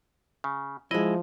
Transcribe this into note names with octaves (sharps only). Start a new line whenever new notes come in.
C#3
F3 G#3 E4 D#5